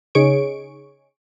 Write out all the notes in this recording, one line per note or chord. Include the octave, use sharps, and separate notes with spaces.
C#3 D#4 G#4 C#5 C#6 D7